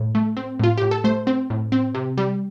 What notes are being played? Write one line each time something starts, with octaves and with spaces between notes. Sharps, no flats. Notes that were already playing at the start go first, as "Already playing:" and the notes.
Already playing: A2
A3
C4
A2 F4
A2 G4
A4
A3 C5
C4
A2
C4
C3
G3